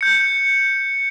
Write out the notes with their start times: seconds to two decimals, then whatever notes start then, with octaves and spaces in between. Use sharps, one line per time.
0.01 G6 C#7